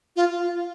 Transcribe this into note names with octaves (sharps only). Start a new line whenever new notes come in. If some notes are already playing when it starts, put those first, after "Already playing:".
F4